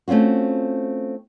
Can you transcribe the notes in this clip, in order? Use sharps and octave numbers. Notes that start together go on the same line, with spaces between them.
A3 C4 C#4 F4 F#4